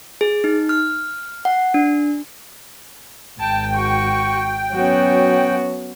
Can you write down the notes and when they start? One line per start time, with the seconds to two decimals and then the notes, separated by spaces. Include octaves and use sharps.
0.21 G#4
0.44 D#4
0.69 F6
1.45 F#5
1.74 D4
3.40 G#1 G5 A5
3.74 F#4 C#6
4.74 F#3 B3 C#4 F#4